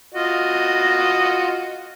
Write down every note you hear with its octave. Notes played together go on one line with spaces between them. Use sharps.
F4 F#4 D#5